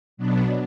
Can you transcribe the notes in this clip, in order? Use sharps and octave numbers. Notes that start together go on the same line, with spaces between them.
B2 F#3 B3 D4